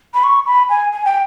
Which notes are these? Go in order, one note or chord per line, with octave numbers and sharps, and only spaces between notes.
B5
C#6
B5
G#5
G#5
G5